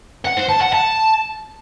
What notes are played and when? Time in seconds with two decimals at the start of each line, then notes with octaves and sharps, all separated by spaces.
0.25 F#5
0.37 C5
0.49 A5
0.61 F#5
0.73 A5